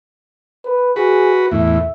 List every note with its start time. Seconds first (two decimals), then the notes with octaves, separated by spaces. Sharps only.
0.65 B4
0.96 F#4 G#4 B4
1.51 E2 A2 E5